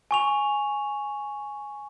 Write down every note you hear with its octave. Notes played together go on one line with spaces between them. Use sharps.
G#5 C#6 F7